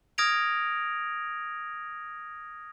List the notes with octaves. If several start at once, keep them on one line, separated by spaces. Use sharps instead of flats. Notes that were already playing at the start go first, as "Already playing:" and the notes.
D#6 F6 G#6 A#6 D7 F7